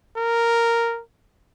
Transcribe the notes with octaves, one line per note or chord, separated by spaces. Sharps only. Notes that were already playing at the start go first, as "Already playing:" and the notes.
A#4